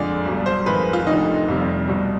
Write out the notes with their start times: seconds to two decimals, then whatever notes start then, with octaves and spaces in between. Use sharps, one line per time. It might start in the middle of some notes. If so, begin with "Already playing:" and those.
Already playing: F2 D3 G#3 D5
0.26 B1 B2 G3
0.46 C5
0.66 F2 D#3 G#3 B4
0.93 F4
1.07 F1 F2 D3 D#4
1.47 F1 F2 C3 G3
1.88 C2 B2 G3